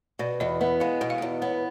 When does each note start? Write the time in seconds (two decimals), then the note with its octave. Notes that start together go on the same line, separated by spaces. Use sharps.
0.19 B2 D5
0.40 E2 D#5
0.61 B3 E5
0.80 G#3 F5
1.01 B2 F#5
1.10 F5
1.18 E2 F#5
1.42 B3 C#5